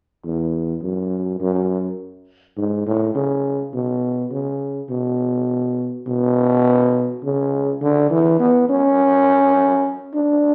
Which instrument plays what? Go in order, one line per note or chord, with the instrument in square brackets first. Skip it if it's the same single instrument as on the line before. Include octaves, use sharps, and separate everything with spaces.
[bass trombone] E2
F#2
F#2
G#2
A2
C#3
B2
C#3
B2
B2
C#3
D3
E3
B3
C#4
D4